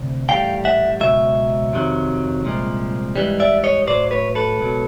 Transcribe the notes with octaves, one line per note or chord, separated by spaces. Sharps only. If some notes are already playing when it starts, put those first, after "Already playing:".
Already playing: D2 C3
A2 E3 G3 F5 G5
E5 F#5
C#2 B2 F#3 E5
F2 C3 D#3 F#3
C2 A#2 F3 G#3
G#2 E3 G3
D5 E5
C#5 D#5
A2 F#3 C5 D5
B4 C#5
A4 B4
C#2 B2 F#3